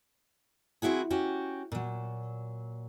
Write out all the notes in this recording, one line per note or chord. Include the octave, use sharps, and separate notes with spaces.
C4 D4 E4 F#4 G#4
C#4 F#4 G4
A#2 F#3